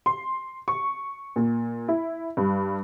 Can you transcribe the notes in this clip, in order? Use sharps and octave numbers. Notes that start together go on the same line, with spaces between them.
C6
C#6
A#2
E4
G2